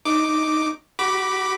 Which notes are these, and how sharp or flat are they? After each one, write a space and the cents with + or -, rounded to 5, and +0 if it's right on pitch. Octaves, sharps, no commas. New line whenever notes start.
D#4 +0 D6 +0
F#4 +35 B5 -10 D6 +0